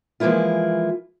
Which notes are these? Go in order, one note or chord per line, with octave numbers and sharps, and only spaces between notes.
E3 F3 G#3 A#3 E4 F4